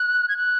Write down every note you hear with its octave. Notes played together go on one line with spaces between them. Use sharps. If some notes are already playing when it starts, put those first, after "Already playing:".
Already playing: F#6
G#6
F#6